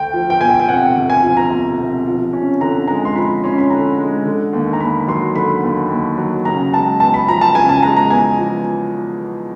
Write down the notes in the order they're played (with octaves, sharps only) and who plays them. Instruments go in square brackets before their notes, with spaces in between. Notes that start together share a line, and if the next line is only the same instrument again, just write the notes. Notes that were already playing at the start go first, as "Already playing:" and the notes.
Already playing: [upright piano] D2 [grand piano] G5
[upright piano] F3
[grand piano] G5
[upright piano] E1 [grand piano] G#5
[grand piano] G5
[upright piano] C3 [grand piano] F#5
[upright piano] D2
[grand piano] G#5
[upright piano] F3
[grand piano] A#5
[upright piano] E1
C3
F3
C#4
[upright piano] D3 [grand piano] A#5
[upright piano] G#3 [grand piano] A#5
[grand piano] C6
[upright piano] F3 [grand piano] B5
[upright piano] C#4 [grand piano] C6
[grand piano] B5
[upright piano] D3 [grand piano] A#5
[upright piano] G#3
D3
D#2
[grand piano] A#5
[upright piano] D#2 [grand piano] B5
[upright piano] F#3 [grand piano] C6
[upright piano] D3 [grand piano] B5
[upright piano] D#2
D#2
F#3
[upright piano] C#3 [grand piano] A#5
[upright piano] G#3 [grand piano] A5
[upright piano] E2 [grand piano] A5
[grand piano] B5
[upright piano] F3 [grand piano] A#5
[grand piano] A5
[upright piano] C#3 [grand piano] G#5
[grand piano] A5
[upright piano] G#3 [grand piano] A#5
[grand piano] A#5
[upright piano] E2 [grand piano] G#5
[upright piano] F3